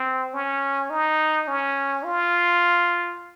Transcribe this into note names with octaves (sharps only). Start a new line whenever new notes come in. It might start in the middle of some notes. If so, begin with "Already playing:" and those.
Already playing: C4
C#4
D#4
C#4
F4